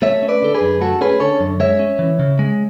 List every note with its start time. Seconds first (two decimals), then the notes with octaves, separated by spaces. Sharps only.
0.02 A3 C#5 E5
0.22 C#4
0.28 B4 D5
0.42 D3 A4
0.54 G#4 B4
0.61 F#2
0.81 A3 F#4 A4
1.01 C#4 G#4 B4
1.20 D3 A4 C#5
1.40 F#2
1.60 G#3 C#5 E5
1.79 C#4
1.99 E3
2.19 C#3
2.39 G#3